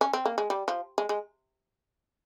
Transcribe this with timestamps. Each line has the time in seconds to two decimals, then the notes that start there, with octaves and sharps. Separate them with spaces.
0.01 C#4
0.13 C4
0.25 A#3
0.38 G#3
0.50 G3
0.68 F3
0.98 G#3
1.09 G#3